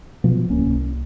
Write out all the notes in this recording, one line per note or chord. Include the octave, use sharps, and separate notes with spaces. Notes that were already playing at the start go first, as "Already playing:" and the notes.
B2 F3
D1 C2 A#3 C#4
C2